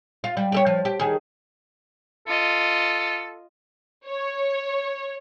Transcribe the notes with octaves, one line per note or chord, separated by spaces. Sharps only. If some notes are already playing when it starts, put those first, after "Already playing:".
F4
G3
G4 A4 C#5
F3
G4
D#3 G#4
F4 A4 D#5
C#5